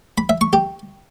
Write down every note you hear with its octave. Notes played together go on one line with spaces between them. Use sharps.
B5
E5
C#6
G4